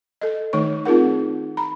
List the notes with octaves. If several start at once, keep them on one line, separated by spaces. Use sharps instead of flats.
A4 D#5
D#3 A3 D#4 C#5 C#6
C4 D#4 F4 G#4 A#4 F#5
A#5 B5